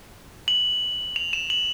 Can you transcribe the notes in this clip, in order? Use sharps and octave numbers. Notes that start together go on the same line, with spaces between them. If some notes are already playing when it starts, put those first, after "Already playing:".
F#7
F7
E7
F#7